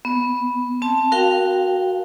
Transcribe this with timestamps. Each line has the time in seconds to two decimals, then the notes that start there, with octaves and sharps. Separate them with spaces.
0.05 B3
0.82 C4 A5
1.12 F#4 A#4 F5 G5